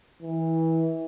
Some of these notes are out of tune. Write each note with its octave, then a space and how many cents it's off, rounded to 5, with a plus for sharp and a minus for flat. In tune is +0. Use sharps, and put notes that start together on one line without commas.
E3 -20